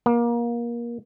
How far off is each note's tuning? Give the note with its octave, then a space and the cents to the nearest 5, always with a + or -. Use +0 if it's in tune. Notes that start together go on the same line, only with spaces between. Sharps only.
A#3 +25